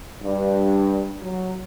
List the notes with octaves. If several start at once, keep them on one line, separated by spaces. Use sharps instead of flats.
G2
F#3